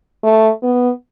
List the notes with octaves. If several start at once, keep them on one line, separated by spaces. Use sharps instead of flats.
A3
B3